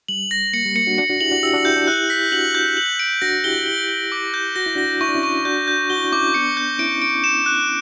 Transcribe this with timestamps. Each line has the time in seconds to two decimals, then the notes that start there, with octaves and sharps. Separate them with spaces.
0.08 G3 F#7
0.31 A#6
0.53 A#3 C#7
0.65 G3
0.76 A#3 C#7
0.87 D4 F#4
0.98 D4 F#4 C#7
1.09 D4 F#4
1.21 E4 G4 F#7
1.31 D4 F#4
1.43 E4 G4 E6
1.54 D4 F#4
1.65 E4 G4 G6
1.76 D4 F#4
1.87 E4 G4 F#6
2.10 B6
2.32 D4 F#4 F#7
2.55 G6
2.77 F#7
2.99 D7
3.22 D4 F#4 A#6
3.44 E4 G4 G7
3.66 G7
3.89 G7
4.12 D6
4.34 G6
4.56 F#4 A#6
4.66 E4
4.75 D4 F#4 A#6
5.01 E4 C#6
5.08 D4
5.15 C#4 E4
5.23 C#6
5.45 D4 F#4 G6
5.68 G6
5.90 F#4 G7
5.97 E4
6.04 D4
6.12 C#4 E4 D6
6.34 B3 D4 C#7
6.57 G6
6.79 C#4 E4 D7
7.02 D7
7.24 E7
7.46 F#6